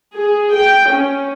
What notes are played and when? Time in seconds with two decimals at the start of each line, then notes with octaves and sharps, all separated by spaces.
0.16 G#4
0.56 G5
0.91 C#4